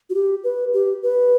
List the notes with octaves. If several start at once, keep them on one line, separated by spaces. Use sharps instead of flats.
F#4
G4
B4
G4
B4